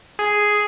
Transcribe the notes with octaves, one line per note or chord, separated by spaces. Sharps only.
G#4